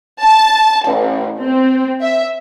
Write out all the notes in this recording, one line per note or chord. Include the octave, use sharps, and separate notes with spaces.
A5
A1
C4
E5